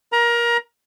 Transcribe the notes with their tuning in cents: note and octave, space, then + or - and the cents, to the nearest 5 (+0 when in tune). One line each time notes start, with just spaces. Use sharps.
A#4 +20 A#5 +25